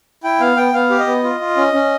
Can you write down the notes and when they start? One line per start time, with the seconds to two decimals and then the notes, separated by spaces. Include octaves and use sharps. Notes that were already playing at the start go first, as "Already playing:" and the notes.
0.24 E4 G5
0.40 B3 F5
0.57 B3 G5
0.74 B3 F5
0.90 G4
0.99 D#5
1.07 B3
1.24 F4
1.40 F4
1.57 C#4
1.73 C#4